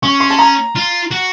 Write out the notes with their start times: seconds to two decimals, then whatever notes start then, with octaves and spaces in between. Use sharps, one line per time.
0.03 C#4 C#6
0.20 C6
0.30 A5
0.39 A#5
0.75 F4
1.11 F#4